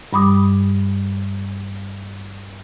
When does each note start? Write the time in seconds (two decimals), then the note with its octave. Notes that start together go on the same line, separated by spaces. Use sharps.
0.13 G2 G3 B5 D6 D#6